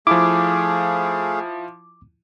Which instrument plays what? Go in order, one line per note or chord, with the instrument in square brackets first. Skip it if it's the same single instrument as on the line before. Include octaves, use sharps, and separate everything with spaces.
[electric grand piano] F3 E4 [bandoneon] A3 G#4 F5 [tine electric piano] D6